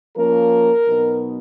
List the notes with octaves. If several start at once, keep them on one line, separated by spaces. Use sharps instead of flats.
F3 A#3 C#4 A#4
B2 F#3 B3 D#4